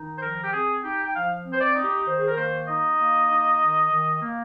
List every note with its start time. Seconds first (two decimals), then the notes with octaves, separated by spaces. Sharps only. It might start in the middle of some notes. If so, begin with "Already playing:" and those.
Already playing: D#3 D#4
0.18 C5
0.22 F3 A#4
0.44 G4
0.53 C4 G#4
0.84 D#4 G4
1.04 G5
1.15 F3 F5
1.45 C4
1.53 C5
1.61 D5
1.76 D#4
1.84 G4
2.06 D#3 C5
2.19 G#4
2.28 A#4
2.37 A#3 C5
2.68 D#4 D#5
2.99 A#3
3.31 D#4
3.61 D#3
3.92 D#3
4.22 A#3